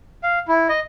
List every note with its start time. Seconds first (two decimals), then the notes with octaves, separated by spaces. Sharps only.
0.23 F5
0.48 E4
0.69 D#5